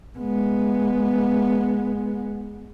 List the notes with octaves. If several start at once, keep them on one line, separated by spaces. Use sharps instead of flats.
G#3 B3